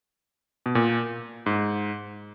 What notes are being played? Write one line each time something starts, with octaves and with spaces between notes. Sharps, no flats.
B2
A#2
G#2